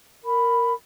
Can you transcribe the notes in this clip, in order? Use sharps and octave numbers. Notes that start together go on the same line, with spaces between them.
A#4 B5